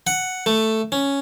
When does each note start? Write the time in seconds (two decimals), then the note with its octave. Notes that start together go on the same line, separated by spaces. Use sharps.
0.07 F#5
0.46 A3
0.92 C#4